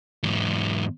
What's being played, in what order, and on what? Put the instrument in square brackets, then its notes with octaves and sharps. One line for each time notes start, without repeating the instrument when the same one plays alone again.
[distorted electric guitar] E2 G#2